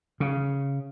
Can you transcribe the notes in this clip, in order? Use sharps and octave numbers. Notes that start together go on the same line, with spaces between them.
C#3